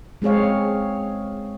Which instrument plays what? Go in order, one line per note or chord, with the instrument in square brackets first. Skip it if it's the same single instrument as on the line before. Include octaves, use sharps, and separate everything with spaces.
[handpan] G#3 C4 G#4 C#5 F5